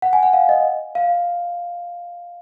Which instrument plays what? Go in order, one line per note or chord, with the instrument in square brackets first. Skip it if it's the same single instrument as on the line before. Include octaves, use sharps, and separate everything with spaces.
[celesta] F#5
G#5
F#5
F5
D#5
F5